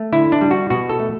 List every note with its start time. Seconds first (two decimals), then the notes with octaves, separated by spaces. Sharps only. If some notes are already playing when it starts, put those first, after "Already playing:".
Already playing: A3
0.12 D3 E4
0.32 D4
0.41 G3
0.51 F#4
0.70 B2 F#4
0.89 A4
0.99 A3